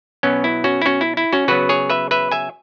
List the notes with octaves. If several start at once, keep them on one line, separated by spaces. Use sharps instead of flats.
B2 F#3 B3 C#4
E4
C#4 F#4
E4
C#4 F#4
E4
E4
C#4 F#4
C#3 F#3 B3 F#4 B4
G#4 C#5
B4 E5
B4 E5
E5 G#5